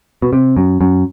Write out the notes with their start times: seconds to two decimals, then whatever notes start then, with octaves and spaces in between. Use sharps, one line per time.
0.22 B2
0.33 C3
0.57 F#2
0.81 F#2